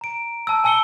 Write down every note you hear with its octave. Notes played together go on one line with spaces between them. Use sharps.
A#5 D7
A5 E6
G#5 A5 E6 C#7 G7